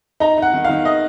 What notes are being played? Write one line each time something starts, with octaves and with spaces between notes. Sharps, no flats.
D#4 A#5
D#4 F#5
D#3
D#3 F5
D#4 D#5